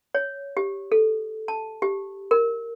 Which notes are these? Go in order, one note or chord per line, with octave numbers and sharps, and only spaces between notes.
C#5
G4
A4
A5
G4
A#4